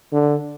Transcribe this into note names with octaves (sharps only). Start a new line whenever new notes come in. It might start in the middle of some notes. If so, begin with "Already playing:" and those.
D3